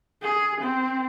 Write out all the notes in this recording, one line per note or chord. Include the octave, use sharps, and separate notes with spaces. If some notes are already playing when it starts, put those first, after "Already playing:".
G#4
C4